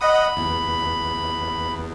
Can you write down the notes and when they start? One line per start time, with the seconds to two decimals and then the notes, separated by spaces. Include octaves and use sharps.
0.01 D#5 F#5 B5 D#6
0.36 E2